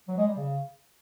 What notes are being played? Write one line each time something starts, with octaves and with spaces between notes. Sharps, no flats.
F#3
G#3
G3
C#3